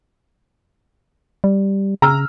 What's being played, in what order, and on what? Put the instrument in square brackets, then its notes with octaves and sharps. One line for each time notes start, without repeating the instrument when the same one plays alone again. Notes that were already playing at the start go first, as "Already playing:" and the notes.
[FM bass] G3
[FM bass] C#3 [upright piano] A#5 E6 F6